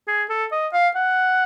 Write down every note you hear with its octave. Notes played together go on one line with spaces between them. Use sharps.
G#4
A4
D#5
F5
F#5